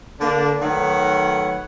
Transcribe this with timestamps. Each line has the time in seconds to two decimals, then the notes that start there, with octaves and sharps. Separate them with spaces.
0.21 D3 A#3 D4
0.61 D#3 F#3 A3 B4 C#5 F#5